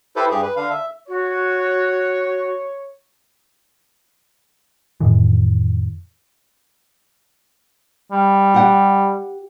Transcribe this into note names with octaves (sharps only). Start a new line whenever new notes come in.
E4 G4 A4 B4 C5
G2 G4 G#4
B4
D3 D4 F5
E5
F#4 C#5
F2 A2 D#3 E3
G3
G4 F#5